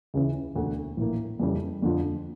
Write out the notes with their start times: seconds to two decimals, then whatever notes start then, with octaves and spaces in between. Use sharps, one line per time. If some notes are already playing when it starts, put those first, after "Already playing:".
0.14 C#2 C#3 E3
0.55 E1 D2 D3 A3
0.97 A#1 A2 E3 A#3
1.40 F2 C#3 E3 G3
1.82 F2 D3 F3